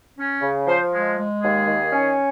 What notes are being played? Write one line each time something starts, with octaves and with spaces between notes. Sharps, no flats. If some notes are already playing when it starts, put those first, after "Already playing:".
C#4
C#3
F3 C5
G#3
G#3
D#2 G#4
D#3
C#4